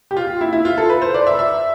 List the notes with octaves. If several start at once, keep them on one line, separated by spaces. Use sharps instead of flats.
G4
F4
E4
E4
F4
A4
B4
C5
D5
E5
E5